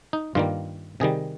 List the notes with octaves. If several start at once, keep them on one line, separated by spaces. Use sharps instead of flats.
D#4
G2 D#3 G3 A#3 F4
C3 D#3 G3 G#4